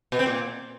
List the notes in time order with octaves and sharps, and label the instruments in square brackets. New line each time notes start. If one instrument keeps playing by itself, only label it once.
[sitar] B2
C4
A#2